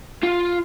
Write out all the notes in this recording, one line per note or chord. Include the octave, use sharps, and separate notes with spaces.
F4